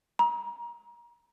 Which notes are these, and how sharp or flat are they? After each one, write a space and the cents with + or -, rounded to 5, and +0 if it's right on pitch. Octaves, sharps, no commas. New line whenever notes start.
A#5 +30